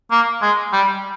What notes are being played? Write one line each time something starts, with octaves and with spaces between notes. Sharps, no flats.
A#3
G#3
G3